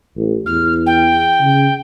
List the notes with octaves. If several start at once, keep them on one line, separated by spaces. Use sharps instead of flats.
A1
E2 F6
G5
C#3